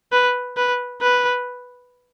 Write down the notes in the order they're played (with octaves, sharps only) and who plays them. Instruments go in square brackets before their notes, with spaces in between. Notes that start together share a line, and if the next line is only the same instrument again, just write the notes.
[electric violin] B4
B4
B4